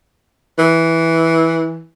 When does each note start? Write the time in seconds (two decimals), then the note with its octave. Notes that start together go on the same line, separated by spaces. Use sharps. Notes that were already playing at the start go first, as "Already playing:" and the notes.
0.59 E3